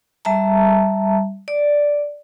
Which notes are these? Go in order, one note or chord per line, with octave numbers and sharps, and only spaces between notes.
G3 E5 A5 A#5
D5